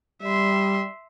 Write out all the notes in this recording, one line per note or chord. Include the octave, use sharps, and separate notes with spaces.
G3 E5 C6